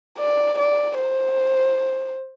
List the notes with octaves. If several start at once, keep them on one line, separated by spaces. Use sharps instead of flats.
D5
D5
C5